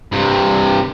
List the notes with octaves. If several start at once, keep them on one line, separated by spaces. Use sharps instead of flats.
G2 C3